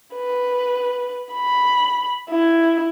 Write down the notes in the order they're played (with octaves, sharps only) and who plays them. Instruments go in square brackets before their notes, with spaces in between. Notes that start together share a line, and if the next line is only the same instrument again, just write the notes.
[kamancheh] B4
B5
E4